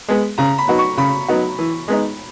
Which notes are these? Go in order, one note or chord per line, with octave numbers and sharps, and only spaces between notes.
G#3 B3
C#3 A#5
B5
F#3 B3 D#4 F#4
C#6
C#3 B5
F#3 B3 D#4 F#4
E3
G#3 B3 D#4